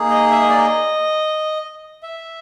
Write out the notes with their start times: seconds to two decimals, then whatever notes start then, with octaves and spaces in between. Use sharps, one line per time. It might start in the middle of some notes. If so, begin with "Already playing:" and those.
Already playing: A#3 D#4 G#4
0.10 D#5
0.31 E5
0.40 D#5
0.49 D5
0.57 D#5
2.03 E5